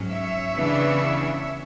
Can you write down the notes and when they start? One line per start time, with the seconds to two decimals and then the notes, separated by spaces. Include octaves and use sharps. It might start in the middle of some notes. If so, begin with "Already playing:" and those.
Already playing: G#2 F#3 C#4
0.10 C#5 E5
0.55 C#3 E3 B3 D4